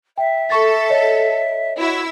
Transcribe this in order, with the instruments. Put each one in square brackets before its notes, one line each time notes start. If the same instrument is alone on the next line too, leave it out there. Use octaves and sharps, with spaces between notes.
[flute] E5 [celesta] G5
[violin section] A4 [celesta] C#6 A6
[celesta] C#5 D#5
[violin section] E4 E6 [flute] F#4